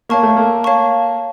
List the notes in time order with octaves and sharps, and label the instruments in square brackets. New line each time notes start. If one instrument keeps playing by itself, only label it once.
[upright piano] A#3 [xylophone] C#5 F5 A5 C#6
[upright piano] A3
A#3
[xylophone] C#5 F5 A5 C#6